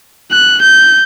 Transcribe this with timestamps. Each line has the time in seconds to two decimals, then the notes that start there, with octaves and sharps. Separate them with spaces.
0.31 F#6
0.61 G6